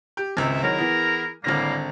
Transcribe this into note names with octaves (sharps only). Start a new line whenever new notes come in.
G4
G#1 C#2 E5
D#3 F#3 E4 G#4 A#4
E3 B3
G#1 A2 D3 G3 A#3 A#6